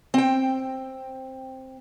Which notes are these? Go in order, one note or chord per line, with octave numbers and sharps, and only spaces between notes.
C4 G5